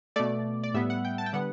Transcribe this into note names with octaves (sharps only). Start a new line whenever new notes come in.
B2 A3 D5
D5
A2 G3 B3 E5
F#5
G5
A5
G5
D3 G3 B3 F#5